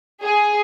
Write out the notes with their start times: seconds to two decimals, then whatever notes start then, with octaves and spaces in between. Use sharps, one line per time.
0.23 G#4